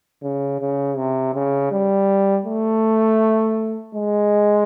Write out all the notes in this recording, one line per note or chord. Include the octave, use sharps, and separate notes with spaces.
C#3
C#3
C3
C#3
G3
A3
G#3